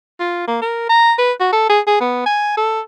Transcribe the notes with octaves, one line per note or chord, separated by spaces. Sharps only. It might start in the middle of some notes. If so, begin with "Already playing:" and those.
F4
A#3
A#4
A#5
B4
F#4
A4
G#4
G#4
B3
G#5
A4